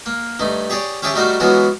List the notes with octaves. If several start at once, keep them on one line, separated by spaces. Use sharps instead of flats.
A#3
G2 A3 D#4
G4 G#4 C#5 D5
C#4 G4 G#4 E5 G5 A5
G3 A3 D#4 F#4 A#4 C5
E3 F#3 G#3 B3 F4 F#4